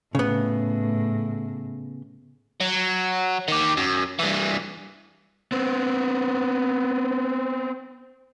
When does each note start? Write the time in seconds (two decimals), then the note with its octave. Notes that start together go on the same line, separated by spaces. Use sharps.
0.15 A2 C#3 B3
2.60 F#3
3.48 D#3 G4
3.77 F#2
4.19 G2 E3
5.52 B3 C4